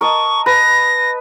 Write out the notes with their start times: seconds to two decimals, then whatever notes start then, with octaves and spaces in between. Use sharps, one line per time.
0.01 A#4 D#5 A5 C#6
0.46 B4 A#6